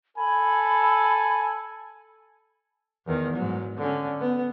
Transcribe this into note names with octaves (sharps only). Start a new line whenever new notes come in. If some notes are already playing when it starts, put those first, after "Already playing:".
A4 G#5 B5
E2 D#3
G#2 F#3
D3 C#4
B3